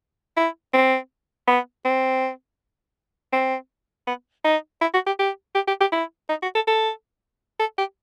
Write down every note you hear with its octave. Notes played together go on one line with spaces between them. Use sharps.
E4
C4
B3
C4
C4
B3
D#4
E4
F#4
G4
G4
G4
G4
G4
E4
D#4
F#4
A4
A4
A4
G4